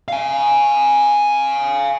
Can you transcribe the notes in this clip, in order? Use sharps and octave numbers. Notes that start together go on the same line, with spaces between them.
F5 G#5